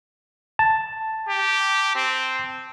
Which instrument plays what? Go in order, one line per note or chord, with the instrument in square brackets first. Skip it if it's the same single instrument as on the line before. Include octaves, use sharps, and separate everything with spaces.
[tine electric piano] A5
[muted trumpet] G4
C4